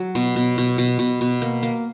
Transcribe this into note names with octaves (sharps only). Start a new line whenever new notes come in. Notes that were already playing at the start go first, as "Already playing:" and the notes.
Already playing: F#3
B2
B2
B2
B2
B2
B2
A#3
A#3